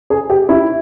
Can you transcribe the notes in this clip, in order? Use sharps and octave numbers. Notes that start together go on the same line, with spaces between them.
G#4
G4
E4